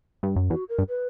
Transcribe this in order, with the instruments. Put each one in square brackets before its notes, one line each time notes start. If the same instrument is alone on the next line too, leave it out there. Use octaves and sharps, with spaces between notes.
[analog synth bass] G2
F#2
[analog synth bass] E2 [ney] F#4
[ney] A#4
[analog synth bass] G2
[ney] B4